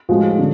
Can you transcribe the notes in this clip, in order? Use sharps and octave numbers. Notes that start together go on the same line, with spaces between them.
A2 F3 G#3 F#4
D3